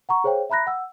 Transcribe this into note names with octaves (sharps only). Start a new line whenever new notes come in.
F#5 A#5 C#6
G#4 C5 C#5 F5 G5
E5 A#5 B5 F#6 A#6
F#5 E6